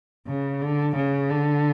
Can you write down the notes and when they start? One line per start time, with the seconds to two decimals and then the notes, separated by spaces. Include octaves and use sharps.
0.27 C#3
0.61 D3
0.96 C#3
1.30 D3